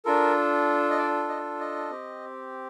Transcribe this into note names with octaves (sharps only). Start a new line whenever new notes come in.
D4 F4 A4 A#4
D#5
D5
D#5
D#5
C4 G4